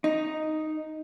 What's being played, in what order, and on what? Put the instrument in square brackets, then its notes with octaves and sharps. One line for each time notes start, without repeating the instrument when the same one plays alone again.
[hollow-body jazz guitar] D#4